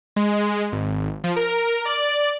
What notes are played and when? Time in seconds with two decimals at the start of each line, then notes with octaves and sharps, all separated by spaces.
0.16 G#3
0.72 G#1
1.24 F3
1.36 A#4
1.85 D5